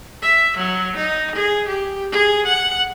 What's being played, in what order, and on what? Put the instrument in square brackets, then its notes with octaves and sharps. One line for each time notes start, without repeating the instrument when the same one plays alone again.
[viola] E5
F#3
D#4
G#4
G4
G#4
F#5